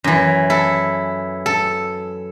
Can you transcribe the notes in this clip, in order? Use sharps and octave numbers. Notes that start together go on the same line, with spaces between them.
F#2 E3
E4 A4
A4